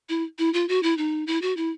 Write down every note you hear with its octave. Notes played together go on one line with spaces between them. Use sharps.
E4
E4
F4
F#4
E4
D#4
E4
F#4
E4